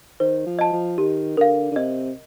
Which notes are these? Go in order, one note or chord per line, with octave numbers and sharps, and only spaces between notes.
D#3 C5
F3
D#5 A5
F3
D#3 G4
D3 A#4 F5
D3
C3 D#5